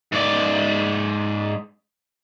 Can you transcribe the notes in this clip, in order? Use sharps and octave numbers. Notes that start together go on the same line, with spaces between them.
G#2 D5